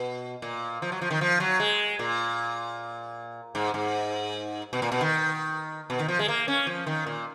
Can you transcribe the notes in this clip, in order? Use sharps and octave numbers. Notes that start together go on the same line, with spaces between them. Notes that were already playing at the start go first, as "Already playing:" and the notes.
Already playing: B2
A#2
F3
F#3
F3
D#3
F3
F#3
G#3
A#2
G#2
G#2
B2
A#2
B2
D#3
B2
D#3
F3
G#3
A#3
C#4
F3
D#3
A#2